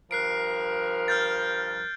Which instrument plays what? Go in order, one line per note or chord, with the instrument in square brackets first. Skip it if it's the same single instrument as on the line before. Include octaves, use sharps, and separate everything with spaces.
[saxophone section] G2 F3 A#4 [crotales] F#6 C7 D7
[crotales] F6 G6 A6